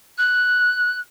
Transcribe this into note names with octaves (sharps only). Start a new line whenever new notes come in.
F#6